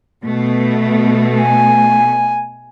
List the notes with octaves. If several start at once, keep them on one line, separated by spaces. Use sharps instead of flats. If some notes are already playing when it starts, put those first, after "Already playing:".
B2 A3
G#5